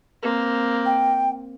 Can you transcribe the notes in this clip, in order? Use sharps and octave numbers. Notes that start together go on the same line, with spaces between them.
A#3 C4
G5